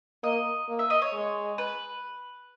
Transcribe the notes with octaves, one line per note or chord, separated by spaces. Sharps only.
A#3 D#5
A#3
E5
D#5
C#5
G#3
B4